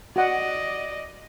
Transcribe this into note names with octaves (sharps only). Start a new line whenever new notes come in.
F#4 D5 D#5 F#5